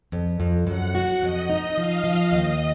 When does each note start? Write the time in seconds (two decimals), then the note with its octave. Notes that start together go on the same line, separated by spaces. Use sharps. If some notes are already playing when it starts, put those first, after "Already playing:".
0.12 F2
0.40 F2
0.67 F#2 F#5
0.95 F#4
1.22 F2 D#5
1.50 D#4
1.76 F3 F5
2.04 F3
2.32 D#2 D#5